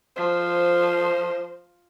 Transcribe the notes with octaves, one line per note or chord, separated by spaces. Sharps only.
F3 C5